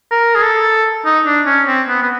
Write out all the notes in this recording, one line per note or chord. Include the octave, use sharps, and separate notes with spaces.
A#4
G#4
A4
D#4
D4
C#4
C4
B3
B3